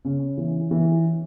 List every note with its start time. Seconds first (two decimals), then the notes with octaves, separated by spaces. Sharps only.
0.05 C#3 C#4
0.38 E3
0.71 E3